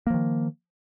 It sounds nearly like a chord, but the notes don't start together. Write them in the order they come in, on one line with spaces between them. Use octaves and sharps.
A#3 F3 D#3